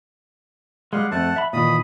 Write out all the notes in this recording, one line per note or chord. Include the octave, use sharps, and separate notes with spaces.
G3 G#3 F5 F#5
F2 A3 F#5 A5
E5 B5
A#2 D#3 E3 B5 D#6